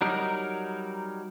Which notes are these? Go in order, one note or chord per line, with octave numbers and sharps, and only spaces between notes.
F#3 G3 D#4 A#4